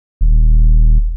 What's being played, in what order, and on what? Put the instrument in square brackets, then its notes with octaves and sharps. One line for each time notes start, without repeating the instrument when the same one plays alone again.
[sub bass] D#1